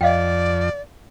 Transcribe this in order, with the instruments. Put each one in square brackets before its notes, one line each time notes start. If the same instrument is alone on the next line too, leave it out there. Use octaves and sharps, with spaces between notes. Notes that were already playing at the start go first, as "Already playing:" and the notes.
[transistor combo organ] F2 [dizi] D5 [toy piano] D#5 F5 G5